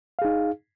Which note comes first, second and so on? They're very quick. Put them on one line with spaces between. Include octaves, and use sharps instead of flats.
F5 G#4 D#4